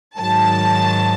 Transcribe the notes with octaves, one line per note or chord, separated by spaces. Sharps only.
G#2 D#3 F#3 A5